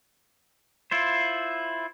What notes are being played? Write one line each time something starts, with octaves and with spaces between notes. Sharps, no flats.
E4 F4 C5